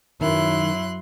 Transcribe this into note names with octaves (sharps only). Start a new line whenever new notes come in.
F#2 D#3 F#3 E4 C6 F#6